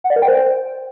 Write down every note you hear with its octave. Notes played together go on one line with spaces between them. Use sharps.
F#5
D5
A#4
G5
C5